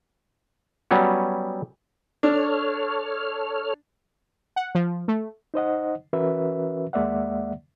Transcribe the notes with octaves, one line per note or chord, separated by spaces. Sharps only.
F#3 G3 B3 C#4
D4 A4 C#5 F6
F#5
F3
A3
D#4 C5 D#5 F#5
E3 C#4 F#4 A#4 B4 E5
D#2 G#3 A#3 D5 E5 F#5